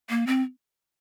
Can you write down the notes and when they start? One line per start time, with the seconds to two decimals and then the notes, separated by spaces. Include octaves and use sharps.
0.10 A#3
0.27 C4